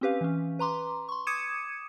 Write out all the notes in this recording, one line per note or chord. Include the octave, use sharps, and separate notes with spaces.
C4 C#4 G4 B4 F5
E3 C#4
B4 A#5 C6 D6
C6 C#6
D6 D#6 G#6 C#7 D#7 E7